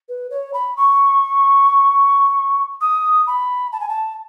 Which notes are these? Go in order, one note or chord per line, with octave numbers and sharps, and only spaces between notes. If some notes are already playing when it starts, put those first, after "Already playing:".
B4
C#5
B5
C#6
D#6
B5
A5
G#5
A5